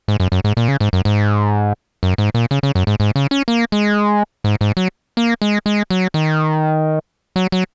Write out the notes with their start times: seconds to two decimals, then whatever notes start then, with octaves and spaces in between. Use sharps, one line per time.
0.08 G#2
0.20 F#2
0.32 F#2
0.44 G#2
0.57 A#2
0.68 C#3
0.80 G#2
0.93 F#2
1.05 G#2
2.03 F#2
2.18 G#2
2.34 A#2
2.51 C#3
2.63 C#3
2.75 F#2
2.87 G#2
3.00 G#2
3.16 C#3
3.31 C#4
3.48 A#3
3.72 G#3
4.44 G#2
4.61 G#2
4.77 F#3
5.17 A#3
5.42 G#3
5.66 G#3
5.90 F#3
6.14 D#3
7.36 F#3
7.52 F#3